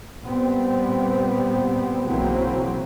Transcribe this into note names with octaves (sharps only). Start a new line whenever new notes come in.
A#2 G3 B3 C4
B1 C#3 E3 F#3 A#3 C4